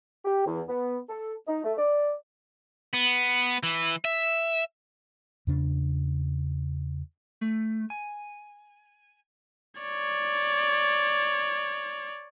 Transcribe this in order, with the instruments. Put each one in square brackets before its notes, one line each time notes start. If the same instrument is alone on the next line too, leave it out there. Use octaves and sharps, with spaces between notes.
[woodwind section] G4
E2
B3
A4
D#4
A3
D5
[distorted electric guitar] B3
E3
E5
[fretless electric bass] E2 C#3 D4
[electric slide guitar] A3
G#5
[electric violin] C#5 D5